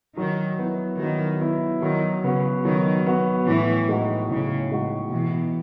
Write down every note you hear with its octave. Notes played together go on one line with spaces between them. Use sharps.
D#3 F#3
B3 E4
D#3 F#3
B3 E4
D#3 F#3
C#3 B3 F#4
D#3 F#3
B3 F#4
A2 E3
G#3 D#4 F#4
A2 C#3
G#3 D#4 F#4
B2 E3